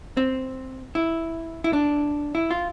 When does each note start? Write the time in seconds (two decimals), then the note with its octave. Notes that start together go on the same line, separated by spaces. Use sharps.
0.17 C4
0.95 E4
1.64 E4
1.73 D4
2.35 E4
2.51 F4